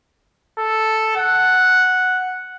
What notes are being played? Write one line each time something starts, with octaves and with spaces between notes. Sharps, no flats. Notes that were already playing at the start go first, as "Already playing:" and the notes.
A4
F#5